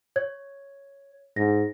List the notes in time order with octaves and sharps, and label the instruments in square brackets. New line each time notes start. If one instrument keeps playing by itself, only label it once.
[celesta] C#5 G#6
[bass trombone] G#2 [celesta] A#6